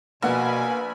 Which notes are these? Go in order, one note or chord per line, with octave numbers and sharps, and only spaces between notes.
A#1 B2 A#3 B3 F#5 G#5 B5